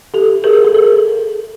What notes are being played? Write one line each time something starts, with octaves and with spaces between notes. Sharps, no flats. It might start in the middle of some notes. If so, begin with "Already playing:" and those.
G4 A4
G#4 A#4
A4
G#4 A#4